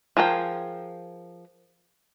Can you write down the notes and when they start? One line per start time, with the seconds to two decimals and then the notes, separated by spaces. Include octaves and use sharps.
0.17 F3 G#4 A#4 G5